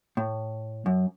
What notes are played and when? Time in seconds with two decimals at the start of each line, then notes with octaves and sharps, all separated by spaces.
0.17 A2
0.86 F#2